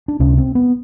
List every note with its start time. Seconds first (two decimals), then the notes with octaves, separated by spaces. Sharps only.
0.08 D4
0.19 C#2 C3 C#4
0.38 C4
0.55 B3